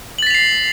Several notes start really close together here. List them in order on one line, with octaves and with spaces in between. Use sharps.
F#7 A6 B6 F7 C7